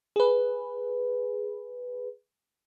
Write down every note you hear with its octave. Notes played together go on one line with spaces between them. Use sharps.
G#4 B4